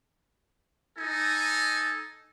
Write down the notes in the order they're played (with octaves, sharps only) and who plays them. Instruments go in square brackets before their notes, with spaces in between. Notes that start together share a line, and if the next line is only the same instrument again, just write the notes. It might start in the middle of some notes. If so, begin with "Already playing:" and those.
[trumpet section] D#4 A4 G#5